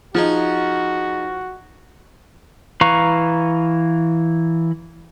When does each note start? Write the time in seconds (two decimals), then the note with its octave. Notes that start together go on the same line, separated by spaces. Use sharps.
0.15 F3 D#4 F#4 G#4 F#5
2.81 E3 B4 F5 A#5 C#6